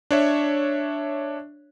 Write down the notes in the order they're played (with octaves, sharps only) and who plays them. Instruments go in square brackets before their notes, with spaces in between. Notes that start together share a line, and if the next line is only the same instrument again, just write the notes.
[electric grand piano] D4 C#5 E5